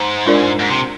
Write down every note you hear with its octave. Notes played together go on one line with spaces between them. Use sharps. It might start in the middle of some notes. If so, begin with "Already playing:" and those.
Already playing: G#2
G#3 D4 F4 A#4 D5
G#2
C3